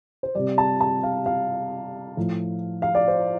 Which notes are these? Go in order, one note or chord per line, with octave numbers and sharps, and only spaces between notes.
C5
C3 G3 D5
A5
A5
F5
F5
A2 F3
F5
D5
C5